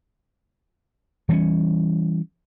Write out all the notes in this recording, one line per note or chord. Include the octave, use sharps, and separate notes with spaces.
E3 G3 A#3 C#4